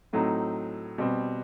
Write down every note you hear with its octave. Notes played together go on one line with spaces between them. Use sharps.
A2 F#3 A3 C4 D#4
B2 G3 C4